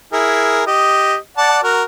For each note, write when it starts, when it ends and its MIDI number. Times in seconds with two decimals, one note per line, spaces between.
0.13 0.63 64
0.13 0.63 68
0.13 0.63 70
0.67 1.16 67
0.67 1.16 75
1.37 1.59 74
1.37 1.59 78
1.37 1.59 81
1.63 1.83 66
1.63 1.83 70